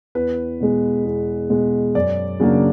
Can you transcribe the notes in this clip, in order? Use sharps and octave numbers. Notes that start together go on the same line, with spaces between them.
E2 B4
B2 G#3
E2
B2 G#3
F#2 D5
C#3 F#3 A#3 D4